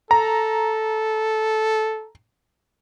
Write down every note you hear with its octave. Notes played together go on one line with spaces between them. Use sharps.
A4 A#5